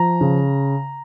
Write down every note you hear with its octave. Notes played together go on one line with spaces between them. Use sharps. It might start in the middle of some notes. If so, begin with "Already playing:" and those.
Already playing: F3 A#5
C#3